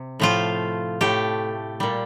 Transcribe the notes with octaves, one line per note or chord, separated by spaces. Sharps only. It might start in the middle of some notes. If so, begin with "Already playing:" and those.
Already playing: C3
A2 F3 A3 F4
A2 A3 G4
A#2 G3